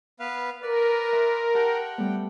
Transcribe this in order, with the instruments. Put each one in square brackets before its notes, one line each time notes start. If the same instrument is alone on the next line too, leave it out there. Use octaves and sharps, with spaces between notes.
[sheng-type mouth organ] B3 B4 F5
[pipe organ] A#4 [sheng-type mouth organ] B4 D5
[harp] E5 B5 C6
[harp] G4 A5 [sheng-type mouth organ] F#5 G5
[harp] G3 A3 B3